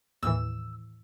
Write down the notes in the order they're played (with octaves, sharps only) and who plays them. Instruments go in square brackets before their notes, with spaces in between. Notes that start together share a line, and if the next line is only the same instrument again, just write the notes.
[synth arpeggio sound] D#2 A2 E3 [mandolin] E6